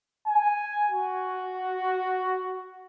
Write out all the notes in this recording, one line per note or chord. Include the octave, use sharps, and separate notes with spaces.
G#5
F#4